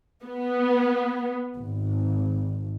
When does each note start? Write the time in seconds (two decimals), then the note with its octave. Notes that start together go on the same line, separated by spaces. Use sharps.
0.24 B3
1.55 G#1